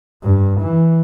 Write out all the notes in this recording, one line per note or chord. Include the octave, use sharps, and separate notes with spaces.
G2
E3